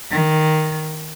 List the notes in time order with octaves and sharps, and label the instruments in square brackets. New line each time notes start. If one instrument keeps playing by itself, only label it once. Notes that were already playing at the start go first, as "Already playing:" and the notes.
[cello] D#3